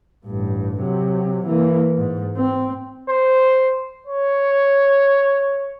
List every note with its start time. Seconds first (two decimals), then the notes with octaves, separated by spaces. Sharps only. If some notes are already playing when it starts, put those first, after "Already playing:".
0.25 A1 G2
0.79 C3 F#3
1.46 E3 A#3
1.98 G#2
2.36 C4
3.09 C5
4.07 C#5